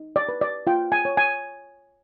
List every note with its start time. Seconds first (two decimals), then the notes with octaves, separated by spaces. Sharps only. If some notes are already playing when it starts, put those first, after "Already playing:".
Already playing: D#4
0.16 D5
0.29 B4
0.41 D5
0.67 F4 G5
0.92 G#5
1.05 C#5
1.17 G#5